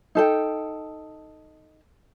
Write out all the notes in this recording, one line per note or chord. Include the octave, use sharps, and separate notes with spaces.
D#4 A4 G5